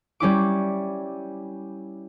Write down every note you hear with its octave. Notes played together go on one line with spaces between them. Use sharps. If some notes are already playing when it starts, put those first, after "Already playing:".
G3 C#4 E4 D6